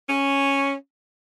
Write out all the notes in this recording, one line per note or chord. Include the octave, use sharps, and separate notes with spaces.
C#4